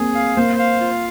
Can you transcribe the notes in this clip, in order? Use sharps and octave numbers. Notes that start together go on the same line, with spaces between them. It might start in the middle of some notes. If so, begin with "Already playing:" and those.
Already playing: A#3 C4 G#4
F5
A#3 C5
F5
F4